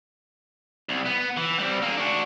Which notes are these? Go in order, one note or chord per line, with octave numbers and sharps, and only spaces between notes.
C2
B3
E3
G3 C4
A#3 G#4
D4 F#4